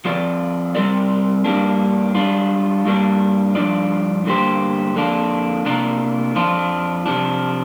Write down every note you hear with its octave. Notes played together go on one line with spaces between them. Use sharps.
F3 C4 F4 D5
G3 C4 A#4 D5
G2 G3 A#3 D4
G3 D4 F4
G2 G3 A#3 D4
G2 F3 D4 F4 D5
G2 D3 A#3 G4 C5
F2 D3 A#3 D4 F4
C3 A#3 D4 F4 A#4
F2 F3 D4 F4
C3 F3 D4